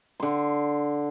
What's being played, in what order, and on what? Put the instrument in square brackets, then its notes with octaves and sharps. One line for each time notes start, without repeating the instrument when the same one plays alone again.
[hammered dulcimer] D3 C6